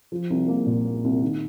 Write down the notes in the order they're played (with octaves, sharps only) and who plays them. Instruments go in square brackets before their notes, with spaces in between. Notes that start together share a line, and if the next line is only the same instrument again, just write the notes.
[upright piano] F3
C2
A#3
A#2
A#3
C2
D#3